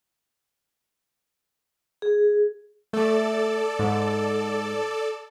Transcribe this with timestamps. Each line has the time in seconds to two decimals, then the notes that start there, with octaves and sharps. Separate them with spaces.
2.02 G#4
2.93 A3 A4 D5
3.79 G#2